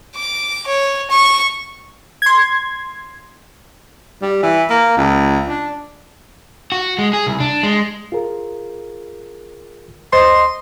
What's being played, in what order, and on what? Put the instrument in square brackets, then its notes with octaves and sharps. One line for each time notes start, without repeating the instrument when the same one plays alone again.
[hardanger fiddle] D6
C#5
C#6
[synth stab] C6 G#6
[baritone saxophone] G3
E3
A#3
C#2
D4
[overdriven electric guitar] F#4
G#3
G#4
C2
D4
G#3
[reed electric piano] F4 G#4 A#4
[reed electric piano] D2 [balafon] C5 [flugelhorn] D#5 [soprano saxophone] C6